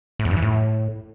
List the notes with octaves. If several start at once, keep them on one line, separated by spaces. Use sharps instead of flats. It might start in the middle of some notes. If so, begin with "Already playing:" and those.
A2
E2
G2
E3
A2